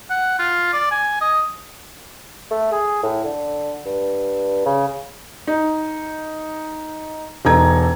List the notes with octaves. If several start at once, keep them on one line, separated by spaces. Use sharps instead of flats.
F#5
F4
D5
G#5
D#5
A3
G#4
A2
D3
G2
C#3
D#4
E1 D#4 A4 A#5 G#6